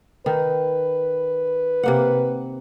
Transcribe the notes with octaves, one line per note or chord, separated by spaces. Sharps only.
D#3 B4
C3 A#3 F#5